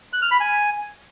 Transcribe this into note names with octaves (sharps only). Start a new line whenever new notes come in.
F#6
F6
B5
G#5